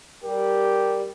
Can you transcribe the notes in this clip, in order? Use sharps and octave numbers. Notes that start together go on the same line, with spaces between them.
G3 G4 A#4